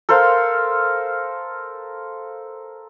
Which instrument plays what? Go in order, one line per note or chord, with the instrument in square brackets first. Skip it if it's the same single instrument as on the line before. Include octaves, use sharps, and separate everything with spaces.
[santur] A4 A#4 C5 F5